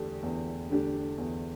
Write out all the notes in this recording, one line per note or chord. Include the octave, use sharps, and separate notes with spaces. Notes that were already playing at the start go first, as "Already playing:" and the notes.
Already playing: E2 D3 A3 D4 G4
E2
D3 A3 D4 G4
E2